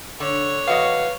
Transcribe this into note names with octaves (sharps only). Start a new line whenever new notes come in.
D3 C#5
E2 F#4 B4 D#5 F5